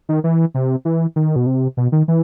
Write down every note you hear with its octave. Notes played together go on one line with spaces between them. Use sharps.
D#3
E3
C3
E3
D#3
B2
C3
B2
D#3
E3